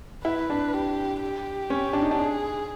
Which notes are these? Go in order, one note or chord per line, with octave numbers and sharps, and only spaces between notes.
E4 B4
D4
G4
G4
C#4
D4
D#4
D4
G#4